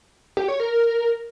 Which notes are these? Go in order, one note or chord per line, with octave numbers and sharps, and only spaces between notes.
G4
C#5
A#4